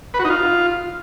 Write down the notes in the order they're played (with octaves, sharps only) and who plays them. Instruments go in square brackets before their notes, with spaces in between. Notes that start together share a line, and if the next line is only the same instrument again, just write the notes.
[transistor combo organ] B4
F#4
D#4
F4